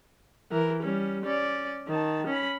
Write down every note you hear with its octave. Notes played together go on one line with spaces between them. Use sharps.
E3 A#4
G3 C#4
C#4 D5
D#3 A5
C#4 B5